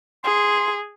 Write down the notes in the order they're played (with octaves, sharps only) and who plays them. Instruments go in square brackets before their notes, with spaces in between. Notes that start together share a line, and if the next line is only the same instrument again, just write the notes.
[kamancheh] G#4 [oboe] C6